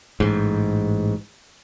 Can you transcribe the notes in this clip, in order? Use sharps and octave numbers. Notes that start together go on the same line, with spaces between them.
A1 G#2